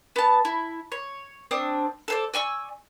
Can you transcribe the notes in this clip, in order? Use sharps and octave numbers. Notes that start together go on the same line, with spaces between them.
B3 A5
E4
C#5
C4 D4 D#6
A4 C5 D5
D5 G#5 C#6 E6